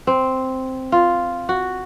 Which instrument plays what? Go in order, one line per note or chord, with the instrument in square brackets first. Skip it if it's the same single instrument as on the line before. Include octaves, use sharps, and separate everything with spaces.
[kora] C4
F4
F#4